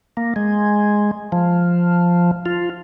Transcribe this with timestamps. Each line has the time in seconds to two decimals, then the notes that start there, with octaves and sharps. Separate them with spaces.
0.17 A#3
0.36 G#3
1.32 F3
2.45 F4